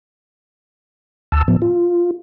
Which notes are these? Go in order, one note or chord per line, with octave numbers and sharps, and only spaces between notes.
D2 A5 E6
A2 F3 B3
F4